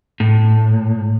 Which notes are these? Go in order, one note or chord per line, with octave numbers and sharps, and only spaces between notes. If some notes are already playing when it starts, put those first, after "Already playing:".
A2